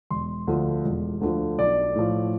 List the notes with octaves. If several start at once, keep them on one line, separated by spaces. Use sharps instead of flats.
E1 C6
D2 D3 F3
E1
D2 D3 F3
B1 D5
A2 F3